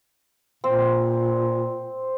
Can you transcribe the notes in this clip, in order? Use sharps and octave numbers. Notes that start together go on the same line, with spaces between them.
A#2 C4